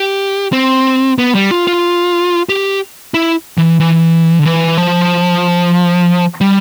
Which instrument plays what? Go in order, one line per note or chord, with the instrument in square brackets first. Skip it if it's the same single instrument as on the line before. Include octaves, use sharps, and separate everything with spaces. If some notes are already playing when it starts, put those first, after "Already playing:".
Already playing: [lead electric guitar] G4
C4
B3
G3
F4
F4
G4
E4
E3
E3
D3
E3
F3
G3